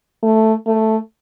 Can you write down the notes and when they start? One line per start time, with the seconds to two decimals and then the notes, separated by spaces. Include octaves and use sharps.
0.23 A3
0.66 A3